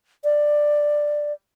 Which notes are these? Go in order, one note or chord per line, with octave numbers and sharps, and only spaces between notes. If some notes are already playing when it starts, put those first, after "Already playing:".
D5